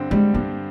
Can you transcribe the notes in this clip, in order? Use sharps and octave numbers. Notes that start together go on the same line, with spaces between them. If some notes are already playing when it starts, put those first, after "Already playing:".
Already playing: G2 D3 G3 C4
G3 G#3
G2 A#3